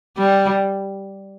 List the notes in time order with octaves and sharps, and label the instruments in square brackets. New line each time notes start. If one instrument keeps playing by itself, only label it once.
[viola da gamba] G3